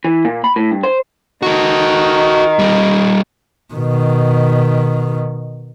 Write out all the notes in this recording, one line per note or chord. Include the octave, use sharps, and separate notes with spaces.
E3
A#2
B5
A2
G2
C5
D#3 F#4 A4
G3 A#3
B2 D#3